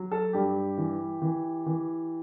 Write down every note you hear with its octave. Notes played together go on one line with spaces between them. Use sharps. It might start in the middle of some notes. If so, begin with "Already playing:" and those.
Already playing: F#3
A4
G2 G4
E3
E3
E3